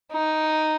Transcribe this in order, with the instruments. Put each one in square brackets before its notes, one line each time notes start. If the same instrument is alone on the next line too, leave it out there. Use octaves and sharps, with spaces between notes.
[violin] D#4